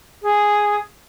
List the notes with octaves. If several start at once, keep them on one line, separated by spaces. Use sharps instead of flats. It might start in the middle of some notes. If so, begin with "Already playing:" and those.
G#4